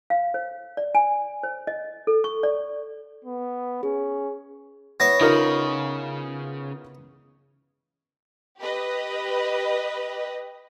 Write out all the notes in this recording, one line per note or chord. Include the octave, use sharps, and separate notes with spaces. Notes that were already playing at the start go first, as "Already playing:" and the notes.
F5
C5
D5
G#5
C5
D#5
A4
C#6
D5
B3
C#4 G#4
B3 E4 C#5 A#6
C#3 D#4 F4 A#4
G4 B4 D#5